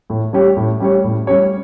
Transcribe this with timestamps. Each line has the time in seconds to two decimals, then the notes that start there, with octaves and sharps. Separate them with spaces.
0.10 A2
0.33 G3 C#4 G4 C#5
0.57 A2
0.80 G3 C#4 G4 C#5
1.04 A2
1.27 G3 C#4 G4 C#5